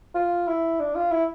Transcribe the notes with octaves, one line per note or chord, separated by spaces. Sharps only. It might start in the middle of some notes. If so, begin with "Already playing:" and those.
F4
E4
D4
F4
E4